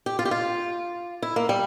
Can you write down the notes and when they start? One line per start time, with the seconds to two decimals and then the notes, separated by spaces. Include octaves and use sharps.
0.06 G4
0.19 F4
0.25 G4
0.31 F4
1.22 E4
1.36 A#3
1.49 G3